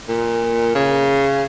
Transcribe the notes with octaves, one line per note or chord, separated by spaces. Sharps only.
A#2
C#3